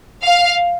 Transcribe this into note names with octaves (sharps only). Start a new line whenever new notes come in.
F5